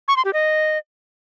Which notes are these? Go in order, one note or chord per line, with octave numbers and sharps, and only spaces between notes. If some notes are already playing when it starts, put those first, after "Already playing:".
C#6
C6
G4
D#5